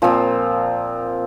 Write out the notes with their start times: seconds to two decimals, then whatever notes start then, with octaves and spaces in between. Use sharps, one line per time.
0.02 A#2 F3 C4 F4